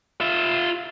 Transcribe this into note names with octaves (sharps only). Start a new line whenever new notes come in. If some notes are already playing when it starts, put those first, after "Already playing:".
F4 E5